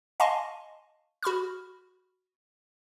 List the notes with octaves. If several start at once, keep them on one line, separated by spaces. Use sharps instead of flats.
D#5 F5 G#5 A5 C6 C#6
F#4 B5 C#6 F6